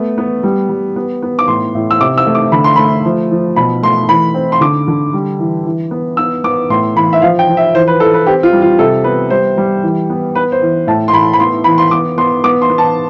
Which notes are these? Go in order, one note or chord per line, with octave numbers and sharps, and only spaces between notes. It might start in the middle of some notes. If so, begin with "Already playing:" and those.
Already playing: A3 B3
B3
G3
G3
B3
B3
D6
A2 C6
A2
E6
C3 D6
E6
A3
D6
D3 B5
C6
A3 B5
F3
F3
B2 B5
A3 C6
E3 B5
C4
C6
D3 D6
D3
G3
E3
E3
B3
B3 E6
B3 D6
A2 C6
E3 B5
E5
F3 F5
G5
F3
E5
E3 C5
B4
E3 A4
B4
C4 G4
F4
G3
F4
C3 A4
B3 B4
G3 C5
G3
E3
B3
B3 B4
C5
E3
A2 A5
C6
A2 B5
B5
B3 C6
E3 B5
C6
B3 D6
B3 C6
B3 D6
C6
B3
A5